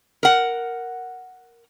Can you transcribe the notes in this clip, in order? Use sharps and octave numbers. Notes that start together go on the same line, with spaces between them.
A#4 F#5